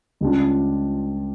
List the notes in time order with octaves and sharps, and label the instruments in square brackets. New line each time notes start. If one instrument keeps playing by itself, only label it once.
[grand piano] C#2 C#3 G3 D4 F4